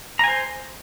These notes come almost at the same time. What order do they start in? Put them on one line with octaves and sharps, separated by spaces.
A#5 G#5 C5